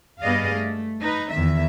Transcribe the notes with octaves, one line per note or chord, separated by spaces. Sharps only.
G2 B3 G#4 D5 D#5 F5
A3
D#4 B4
E2 D#3 E5